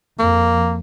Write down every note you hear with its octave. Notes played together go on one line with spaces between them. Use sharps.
F2 A#3